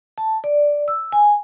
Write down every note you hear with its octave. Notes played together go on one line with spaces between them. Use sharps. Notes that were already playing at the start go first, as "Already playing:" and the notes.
A5
D5
E6
G#5